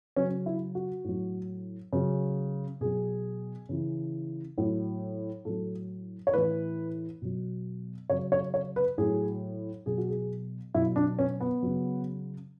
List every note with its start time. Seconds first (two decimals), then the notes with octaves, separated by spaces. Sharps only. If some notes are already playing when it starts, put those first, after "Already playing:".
0.16 C#3 F#3 C#4
0.46 E4
0.75 F#4
1.04 A2 F#3
1.93 C#3 F#3
2.81 B2 F#3 G#4
3.69 C#3 E3
4.58 A2 F#3
5.45 A2 F#3 A4
6.27 C#5
6.34 A2 E3 B4
7.22 B2 F#3
8.10 C#3 F#3 C#5
8.32 C#5
8.54 C#5
8.76 B4
8.98 A2 F#3 G#4
9.86 B2 F#3 G#4
9.98 F#4
10.09 G#4
10.74 B2 F#3 E4
10.96 D4
11.19 C#4
11.40 B3
11.63 C#3 F#3